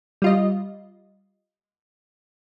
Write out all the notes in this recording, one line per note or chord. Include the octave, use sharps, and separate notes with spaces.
G3 F4 D#5